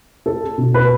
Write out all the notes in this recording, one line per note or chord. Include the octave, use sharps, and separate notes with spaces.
A4
B2
B4